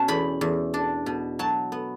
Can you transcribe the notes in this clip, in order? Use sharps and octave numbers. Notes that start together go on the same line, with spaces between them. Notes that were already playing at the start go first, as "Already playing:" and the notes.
Already playing: B2 C#4 A5
E2 B5
E2
D4
B2
F#3 A5
B3